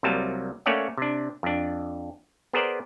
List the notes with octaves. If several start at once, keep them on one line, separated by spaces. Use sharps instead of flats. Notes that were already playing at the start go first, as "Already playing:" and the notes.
C2 C3 F#3 G3 A#3 A5
A3 A#3 C#4 C#5 D5 F#5
C3 D4
F2 D4
B3 G#4 A#4 C5 D5